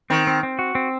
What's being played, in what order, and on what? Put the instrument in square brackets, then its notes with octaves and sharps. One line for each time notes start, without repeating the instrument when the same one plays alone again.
[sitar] D#3 [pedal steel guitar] C4
[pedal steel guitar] C4
C4
F#4
C4